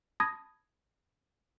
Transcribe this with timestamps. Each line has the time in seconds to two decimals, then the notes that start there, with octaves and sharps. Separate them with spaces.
0.20 A5 B5 D#6 G#6 A#6